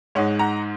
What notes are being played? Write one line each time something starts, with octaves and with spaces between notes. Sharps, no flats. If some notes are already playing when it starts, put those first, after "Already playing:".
G#2 G#3 D#4 C#5 F#5
F#5 A#5